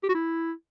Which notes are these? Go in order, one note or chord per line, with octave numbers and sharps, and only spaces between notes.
G4
F#4
E4